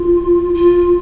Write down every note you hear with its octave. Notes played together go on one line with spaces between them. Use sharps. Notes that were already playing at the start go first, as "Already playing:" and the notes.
Already playing: F4
F4